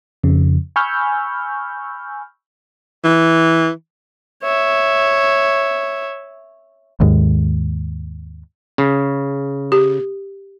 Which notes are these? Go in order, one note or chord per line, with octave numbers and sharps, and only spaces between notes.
F2 C#3
G#5 B5 C#6 E6 F6 G6
E3
C#5 E5
D#2 G#2
C#3
G4